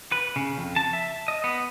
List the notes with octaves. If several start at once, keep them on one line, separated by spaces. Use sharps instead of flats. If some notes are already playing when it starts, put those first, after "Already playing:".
B4
C#3
F2
A5
E5
D#5
B3